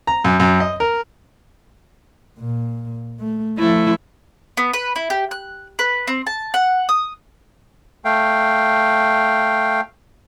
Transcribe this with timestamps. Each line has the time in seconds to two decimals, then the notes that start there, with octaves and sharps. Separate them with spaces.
0.07 A#5
0.24 F#2
0.40 F#2
0.60 D#5
0.80 A#4
2.39 A#2
3.20 A3
3.58 F3 A3 E4
4.57 B3
4.73 B4
4.96 E4
5.10 G4
5.31 F#6
5.79 B4
6.08 C4
6.27 A5
6.54 F#5
6.89 D#6
8.05 A3 F5 G5